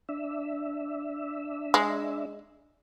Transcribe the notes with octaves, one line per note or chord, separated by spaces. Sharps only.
D4 E5
G#3